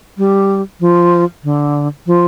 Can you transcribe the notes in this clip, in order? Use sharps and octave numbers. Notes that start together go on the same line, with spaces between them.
G3
F3
D3
F3